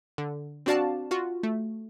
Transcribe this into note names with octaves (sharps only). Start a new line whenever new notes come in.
D3
C4 D4 F#4 D5 F5 A5
F4 F#4
A3